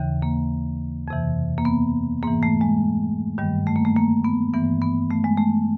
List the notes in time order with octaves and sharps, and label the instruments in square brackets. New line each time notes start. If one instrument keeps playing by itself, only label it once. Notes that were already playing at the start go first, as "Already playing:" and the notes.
Already playing: [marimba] D#2 C#3 E3
A#3
F2 C3 E3
A#3
B3
G#2 E3 A#3
A3
G#3
G2 D#3 G3
A3
A#3
A3
A#3
B3
G2 E3 B3
B3
A3
G#3
A3